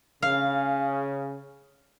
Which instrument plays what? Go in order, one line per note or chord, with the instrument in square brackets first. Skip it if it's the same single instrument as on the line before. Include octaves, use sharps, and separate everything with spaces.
[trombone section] C#3 [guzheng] F5